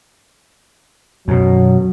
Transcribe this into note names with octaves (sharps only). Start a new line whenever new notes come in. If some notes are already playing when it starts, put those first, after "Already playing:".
F#2 B2 F#3